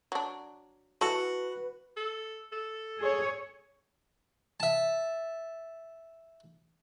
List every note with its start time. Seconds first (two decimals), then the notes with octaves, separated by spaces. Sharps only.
0.12 F#3 D4
1.01 E3 F#4 A4 B4
1.97 A4
2.52 A4
3.00 G#4 C#5
4.60 E5 A5